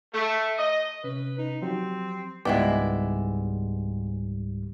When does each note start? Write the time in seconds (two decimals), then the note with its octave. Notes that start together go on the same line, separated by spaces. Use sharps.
0.13 A3
0.57 D#5
1.04 C3 C#4 B4
1.39 D#4
1.62 F3 F#3 C4 G4
2.45 C#2 G#2 G3 G#3 B3 E4 D5 G5